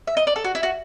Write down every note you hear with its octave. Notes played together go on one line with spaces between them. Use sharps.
E5
D#5
D5
A4
F#4
E4
F#4